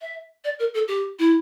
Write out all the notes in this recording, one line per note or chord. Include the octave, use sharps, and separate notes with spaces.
E5
D5
A#4
A4
G4
E4